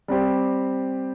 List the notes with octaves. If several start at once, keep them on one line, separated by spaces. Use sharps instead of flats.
G3 C4 G4 C5